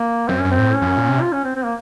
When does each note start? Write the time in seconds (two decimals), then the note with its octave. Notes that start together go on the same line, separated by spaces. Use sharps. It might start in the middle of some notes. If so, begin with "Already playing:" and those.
Already playing: A#3
0.28 F#2 C4
0.40 F#2 C#4
0.51 C4
0.59 A2
0.75 C#4
0.82 F2
0.86 F#2
0.97 A#2
1.09 C3
1.21 F4
1.33 C#4
1.44 C4
1.56 C4
1.65 A#3